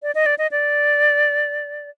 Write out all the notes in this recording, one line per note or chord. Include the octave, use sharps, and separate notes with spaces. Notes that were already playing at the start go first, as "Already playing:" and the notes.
D5
D#5
D5
D#5
D5